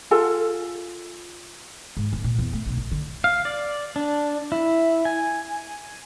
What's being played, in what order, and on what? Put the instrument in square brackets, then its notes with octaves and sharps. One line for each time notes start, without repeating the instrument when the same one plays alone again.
[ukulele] F4 A4 G#5
[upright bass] G#2
D1
A#2
E2
A3
B1
A1
D3
[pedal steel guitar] F5
D5
D4
E4
G#5